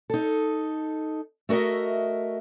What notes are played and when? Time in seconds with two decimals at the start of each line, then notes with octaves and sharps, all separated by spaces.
0.10 D#4 A4
1.49 A3 F#4 A#4 D#5 E5